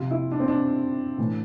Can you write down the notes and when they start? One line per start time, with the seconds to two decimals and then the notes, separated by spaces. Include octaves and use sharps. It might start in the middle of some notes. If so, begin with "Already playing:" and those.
Already playing: C3 F3 F4
0.11 E4
0.32 D4
0.40 C4
0.48 D4
1.18 A2 E3